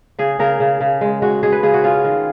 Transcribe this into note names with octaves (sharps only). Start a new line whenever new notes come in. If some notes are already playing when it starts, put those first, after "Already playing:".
C#3 G#4
C#3 A#4
C#3
C#3
G#3
G#3 F#4
G#3 G#4
B4
C#3 G#4
F#4
C#4 F4
D#3